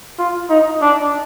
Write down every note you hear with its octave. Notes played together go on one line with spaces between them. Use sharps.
F4
D#4
D4